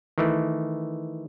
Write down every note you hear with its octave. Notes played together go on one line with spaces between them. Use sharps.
D#3 E3 A3